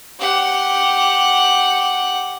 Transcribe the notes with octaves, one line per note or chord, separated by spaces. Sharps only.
G4 F#5